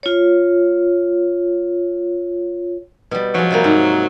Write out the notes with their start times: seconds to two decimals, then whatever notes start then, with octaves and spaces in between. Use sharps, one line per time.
0.03 F4 C#5
3.11 B2 G3
3.34 F3 F#3 G#3
3.51 C3 G3 A#3
3.64 G#2